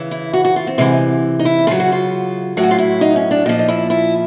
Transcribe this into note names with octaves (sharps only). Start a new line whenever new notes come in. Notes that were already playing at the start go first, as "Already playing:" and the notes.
Already playing: C#3 E3
E4
F#4
F#4
F4
C4
C3 E3 G#3
D#4
E4
C#3 F#3 F4
F#4
F4
A2 F#3
F#4
F4
E4
D#4
C#4
D4
A#2 F3 D#4
D#4
E4
E4